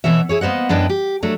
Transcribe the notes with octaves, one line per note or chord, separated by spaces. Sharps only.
B2 E3 B3 C#5 E5
E4 G#4 C#5
A#3 B3 C5 D#5 F#5
F#2 B3 D4 E4 D#5 G5
G4
F#3 A3 D4